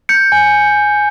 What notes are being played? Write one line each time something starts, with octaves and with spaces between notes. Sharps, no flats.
G6 C#7
G#5